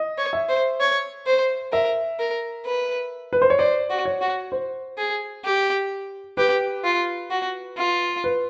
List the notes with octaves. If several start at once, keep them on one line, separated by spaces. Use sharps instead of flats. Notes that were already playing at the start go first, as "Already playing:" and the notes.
Already playing: D#5
C#5
E5
C5
C#5
C5
A#4 E5
A#4
B4
B4
C5
C#5
C5 D5
F#4
C#5
F#4
C5
G#4
G4
G4 B4
F4
F#4
F4
B4